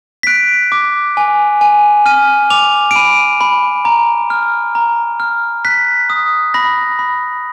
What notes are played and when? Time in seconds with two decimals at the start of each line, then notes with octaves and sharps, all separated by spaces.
0.23 B6
0.27 F#6 D7
0.72 D6
1.17 G#5
1.61 G#5
2.06 F6 D#7
2.50 D6 F7
2.91 D7
2.96 B5 D#7
3.41 B5
3.85 A#5
4.30 F6
4.75 A#5
5.20 F6
5.65 F#6 B6
6.10 D#6
6.54 B5 A#6
6.99 B5